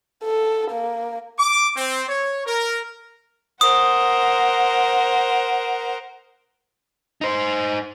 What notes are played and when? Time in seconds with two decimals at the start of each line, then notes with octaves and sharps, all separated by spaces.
0.24 A4
0.71 A#3
1.39 D6
1.77 C4
2.09 C#5
2.46 A#4
3.61 A#4 C5 F#5 D#6
7.21 D#4 C5